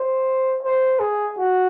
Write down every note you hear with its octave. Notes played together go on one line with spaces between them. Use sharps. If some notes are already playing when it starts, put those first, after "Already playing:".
Already playing: C5
C5
G#4
F#4